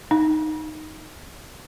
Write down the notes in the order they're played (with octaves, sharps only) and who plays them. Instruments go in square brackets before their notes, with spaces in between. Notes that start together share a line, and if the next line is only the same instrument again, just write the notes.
[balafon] D#4